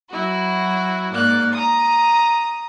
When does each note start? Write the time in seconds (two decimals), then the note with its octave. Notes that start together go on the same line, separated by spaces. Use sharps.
0.10 F#3 E4 F#4
1.13 G#2 A#3 D5 F#6
1.53 A#5 D#6